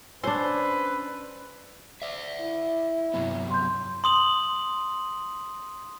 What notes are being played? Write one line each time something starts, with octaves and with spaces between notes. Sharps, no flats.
C#4 D4 B4 C5 D5 E6
D5 E5
E4
G2 C3 F#3 B3
C6 G6
C6 D#6 F#7